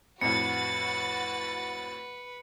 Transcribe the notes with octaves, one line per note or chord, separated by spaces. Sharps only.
F2 A2 F#4 B4 A6 C#7